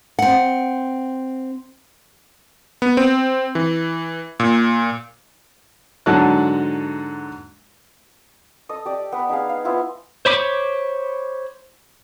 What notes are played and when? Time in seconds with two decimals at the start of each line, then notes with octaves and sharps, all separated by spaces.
0.19 C4 F#5
2.82 B3
2.97 C4
3.55 E3
4.40 A#2
6.06 G#2 D3 F#3 F#4 A5 F#6
8.69 A4 D#5 D#6
8.85 G4 D5
9.12 B3 B4
9.29 D#4 G#4 F5
9.49 F5
9.64 B3 E4 F4 C5
10.25 C5 C#5 B5 D6